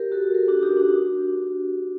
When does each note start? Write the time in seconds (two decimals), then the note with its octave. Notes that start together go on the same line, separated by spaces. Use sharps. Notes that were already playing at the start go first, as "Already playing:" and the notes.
Already playing: G4 A#4
0.12 F#4 A4
0.34 G4 A#4
0.48 D4 F#4
0.63 D#4 G4
0.77 D4 F#4
0.91 D4